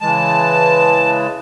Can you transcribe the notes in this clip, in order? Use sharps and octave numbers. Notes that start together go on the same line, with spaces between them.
C#3 E3 G#3 A5